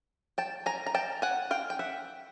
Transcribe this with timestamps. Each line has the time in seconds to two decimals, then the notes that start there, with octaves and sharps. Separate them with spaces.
0.38 G5 A5
0.66 G#5 A#5
0.86 A#5
0.95 G5 A5
1.22 F#5 G#5
1.51 F5 G5
1.70 G5
1.79 E5 F#5